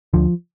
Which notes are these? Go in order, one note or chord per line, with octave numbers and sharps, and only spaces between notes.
D2 D3 F3